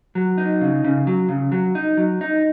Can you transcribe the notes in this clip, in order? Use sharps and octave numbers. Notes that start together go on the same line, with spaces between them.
F#3
D#4
C#3
C#3
F#3
C#3
F#3
D#4
F#3
D#4